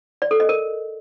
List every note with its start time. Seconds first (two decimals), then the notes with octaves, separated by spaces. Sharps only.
0.22 D5
0.31 A4
0.40 D#5
0.49 A#4